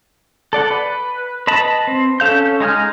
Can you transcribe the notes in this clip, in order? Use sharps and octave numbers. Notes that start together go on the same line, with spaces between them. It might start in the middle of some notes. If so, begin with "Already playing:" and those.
A4 D5 F#5
B4
B4 D#5 A5 B5
C4
C#4 A4 F5 G6
G#3 D#4 G#5 F6